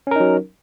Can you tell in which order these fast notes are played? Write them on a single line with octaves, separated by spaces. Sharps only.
C#4 A#4 D#4 F#3